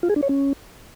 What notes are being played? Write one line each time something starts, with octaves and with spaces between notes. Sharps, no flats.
F4
G#4
D4
C#5
C#4